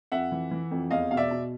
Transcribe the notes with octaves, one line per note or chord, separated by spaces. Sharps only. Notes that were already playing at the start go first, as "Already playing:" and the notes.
F2 E5 F#5
E3
E3
F2
E2 D#5 F5
B2 F5
D5 E5
B2